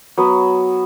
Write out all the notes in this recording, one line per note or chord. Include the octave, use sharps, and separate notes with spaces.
F#3 B3